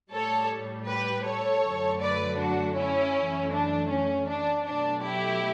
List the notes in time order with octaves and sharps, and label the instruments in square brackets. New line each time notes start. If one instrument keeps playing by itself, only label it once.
[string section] A2 G3 A4 C#5
G4 B4
A4 C#5
F#2 D3 F#3 A3
B4 D5
D4 F#4
C#4 E4
F#2 E3 A3
D4
C#4
D4
B2 F#3 A3 D4
E4 G4